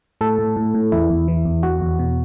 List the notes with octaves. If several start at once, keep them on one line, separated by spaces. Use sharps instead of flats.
A2 A4
A2
A2
A2
E2 E4
E2
E3
E2
E2 F#4
E2
B2